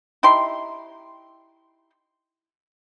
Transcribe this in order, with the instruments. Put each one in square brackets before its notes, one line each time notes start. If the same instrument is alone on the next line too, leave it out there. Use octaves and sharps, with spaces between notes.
[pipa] D#4 E4 G4 C6